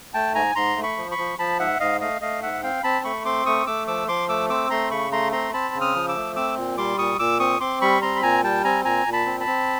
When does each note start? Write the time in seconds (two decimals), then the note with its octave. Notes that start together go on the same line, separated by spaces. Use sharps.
0.14 A3 G5 A5
0.35 G#2 G#5 A#5
0.55 G#2 A#5 C6
0.76 A3
0.83 B5 C#6
0.97 F3
1.11 B5 C#6
1.18 F3
1.39 F3 A5 B5
1.59 G#2 E5 F#5
1.80 G#2 D#5 F5
2.01 A3 D#5 F5
2.21 A3 D#5 F5
2.42 G#2 E5 F#5
2.63 C4 F5 G5
2.83 C4 A5 B5
3.04 A3 B5 C#6
3.25 C4 C6 D6
3.46 A3 C#6 D#6
3.67 A3 D6 E6
3.87 F3 D6 E6
4.08 F3 C6 D6
4.29 A3 D6 E6
4.49 C4 D6 E6
4.70 A3 A#5 C6
4.91 C#3 B5 C#6
5.11 A3 A#5 C6
5.32 C4 A#5 C6
5.53 C4 A5 B5
5.74 C#3
5.81 D#6 F6
5.95 F3
6.08 D6 E6
6.15 A3
6.36 C4 D6 E6
6.57 A#2
6.77 G3 C6 D6
6.98 A#2 C#6 D#6
7.19 A#2 D6 E6
7.40 C4 C#6 D#6
7.60 C4 C6 D6
7.81 G3 B5 C#6
8.02 C4 A#5 C6
8.16 B5
8.22 A#2 G#5 A#5
8.43 G3 G5 A5
8.64 C4 G#5 A#5
8.85 A#2 G#5 A#5
9.06 A#2
9.13 A5 B5
9.26 C4
9.40 A5 B5
9.47 C4